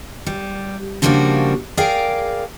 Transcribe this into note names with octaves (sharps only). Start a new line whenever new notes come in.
G3
C#3 F3 G3 A#3 D4 F#4
G#4 A#4 D5 F5 G5